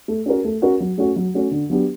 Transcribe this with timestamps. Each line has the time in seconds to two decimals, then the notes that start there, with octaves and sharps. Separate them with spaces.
0.08 A3
0.26 C#4 F#4 A#4
0.44 A3
0.62 C#4 F#4 A#4
0.80 F#3
0.98 A3 C#4 F#4
1.16 F#3
1.34 A3 C#4 F#4
1.51 D3
1.70 F#3 B3 D4 G4